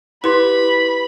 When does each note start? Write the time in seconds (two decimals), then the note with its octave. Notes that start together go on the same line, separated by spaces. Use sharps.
0.24 E4 G4 B4 B5 C6